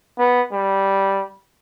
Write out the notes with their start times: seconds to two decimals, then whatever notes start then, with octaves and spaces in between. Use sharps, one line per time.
0.18 B3
0.53 G3